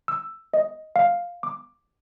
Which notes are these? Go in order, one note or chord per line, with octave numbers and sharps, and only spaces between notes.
E6
D#5
F5
D6